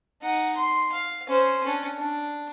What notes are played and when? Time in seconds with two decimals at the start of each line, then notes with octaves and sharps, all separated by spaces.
0.22 D#4 F#5
0.57 C6
0.92 F5
1.28 C#4 C5
1.63 C#4 D4
1.99 D4